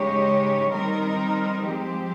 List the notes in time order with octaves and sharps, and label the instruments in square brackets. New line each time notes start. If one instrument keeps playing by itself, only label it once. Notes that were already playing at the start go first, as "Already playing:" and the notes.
Already playing: [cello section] C#3 G#3 D#4 G4 C#5
D#3 G3 C4 D#4 A#4
F3 G#3 C4 G4